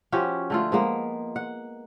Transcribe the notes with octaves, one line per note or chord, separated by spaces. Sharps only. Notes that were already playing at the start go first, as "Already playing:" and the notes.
F3 C#4 F#4 G4
D3 A3 F4
F3 G#3 A#3 B3
F#5